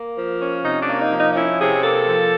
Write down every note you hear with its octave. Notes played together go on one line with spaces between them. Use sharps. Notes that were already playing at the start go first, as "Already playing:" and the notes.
Already playing: A#3
F3
C#4
C3 D#4
D4
A#3
D#4
F3
D#4
D#4
C#4 E4
C3 G#4
A#3 A4
F3